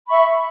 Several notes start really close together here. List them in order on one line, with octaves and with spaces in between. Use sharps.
B5 C#6 E5